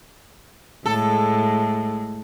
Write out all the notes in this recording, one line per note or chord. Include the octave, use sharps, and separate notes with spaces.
A2 G#3 A4